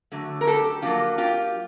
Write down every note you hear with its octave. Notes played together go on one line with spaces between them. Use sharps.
D3 F#3 A3
A#4
G4 A4
F#3 A#3 D4 F4 G4
F4 G4